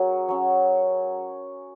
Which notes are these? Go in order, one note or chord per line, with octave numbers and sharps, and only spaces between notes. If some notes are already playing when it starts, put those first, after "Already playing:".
Already playing: F#3 C#4 F#4 G#4 A#4
F#3 C#4